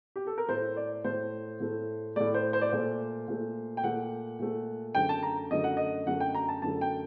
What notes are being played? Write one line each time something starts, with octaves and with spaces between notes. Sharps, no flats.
G4
A4
A#4
A2 A3 C5
D5
A2 A3 C5
A2 A3
A2 A3 D5
C5
C5
D5
A#2 A3 C5
A#2 A3
G5
A#2 A3 F#5
A#2 A3
F#2 D3 A3 G5
A5
A#5
F#2 D3 A3 D#5
F#5
D#5
F#2 D3 A3 F#5
G5
A#5
A5
F#2 D3 A3 A5
G5